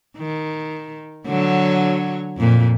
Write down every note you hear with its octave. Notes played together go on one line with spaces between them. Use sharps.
D#3
D3 F#3 C#5
F2 A#2